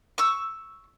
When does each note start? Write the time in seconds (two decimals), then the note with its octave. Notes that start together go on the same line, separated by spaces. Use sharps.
0.18 C#6 E6